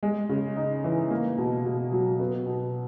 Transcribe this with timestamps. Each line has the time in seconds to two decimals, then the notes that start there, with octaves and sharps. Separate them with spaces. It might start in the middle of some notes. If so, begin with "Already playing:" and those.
0.03 G#3
0.29 C#3
0.57 D#4
0.84 E3
1.11 A#3
1.38 B2
1.65 B2
1.92 F#3
2.19 B3
2.46 B2